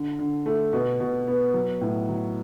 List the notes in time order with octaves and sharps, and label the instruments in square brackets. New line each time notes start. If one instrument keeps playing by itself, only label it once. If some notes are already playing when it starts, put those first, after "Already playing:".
Already playing: [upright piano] D3
D3
A3
B2
B2
B3
F#3
A2
F#3